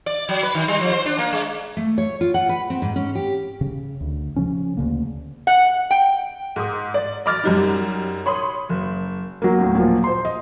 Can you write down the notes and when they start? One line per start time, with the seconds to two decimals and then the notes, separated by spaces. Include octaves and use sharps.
0.06 D5
0.29 F#3
0.43 B4
0.55 D#3
0.68 G3
0.81 F3
0.93 C5
1.06 D4
1.18 A#3
1.33 G#3
1.77 A3
1.98 C#5
2.21 F4
2.34 F#5
2.49 B4
2.70 C4
2.82 G#2
2.96 C#4
3.15 G4
3.61 C#3
4.01 D2
4.36 C#3 F3 C#4
4.77 D2 C#3 A#3
5.47 F#5
5.91 G5
6.56 G#2 D#6
6.94 D5
7.26 D#5 B5 D6 F6 A6
7.44 F#2 G3 D#4
8.26 C#5 B5 C6 D#6
8.69 F#1
9.42 F#3 A#3
9.58 D#2 A2
9.75 A#2 F3
10.04 C5 C6
10.25 D#5